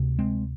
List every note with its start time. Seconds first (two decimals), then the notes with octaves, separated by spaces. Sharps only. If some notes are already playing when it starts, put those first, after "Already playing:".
Already playing: D2 C3
0.19 G#3 C4